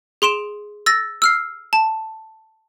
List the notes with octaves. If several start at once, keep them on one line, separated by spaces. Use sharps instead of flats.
G#4 C6 D7 E7
E6 A6 A#6
E6 F6 C7
A5